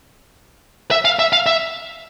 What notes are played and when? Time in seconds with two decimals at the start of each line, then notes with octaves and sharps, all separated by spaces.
0.91 E5
1.05 F5
1.19 E5
1.33 F5
1.46 E5